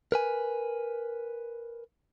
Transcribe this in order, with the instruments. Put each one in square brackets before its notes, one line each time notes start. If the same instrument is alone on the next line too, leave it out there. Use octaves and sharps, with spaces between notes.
[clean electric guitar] A#4 B4 G#5